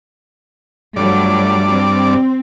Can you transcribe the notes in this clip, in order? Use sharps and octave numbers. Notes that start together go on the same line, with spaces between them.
G2 F3 F#3 A3 D5
C4